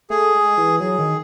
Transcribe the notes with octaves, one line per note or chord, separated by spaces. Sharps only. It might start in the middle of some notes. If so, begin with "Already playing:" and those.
A3 G#4
G#3
E3
F#3 G#4
D#3